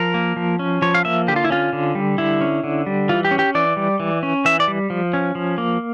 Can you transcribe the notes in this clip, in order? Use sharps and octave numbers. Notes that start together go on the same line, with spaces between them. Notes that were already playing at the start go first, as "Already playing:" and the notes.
Already playing: F3 A#4
A#3
F3
C#4
F3 C#5
F5
A#3 E5
D3 G4
F4
E4
C#4 F4
D3
G3
D3 E4
C#4
D3
G3
E3 F4
G4
C#4
G4
E3 D5
G3
E3
C#4
E3 E5
D5
G3
F3
C#4
F3
A#3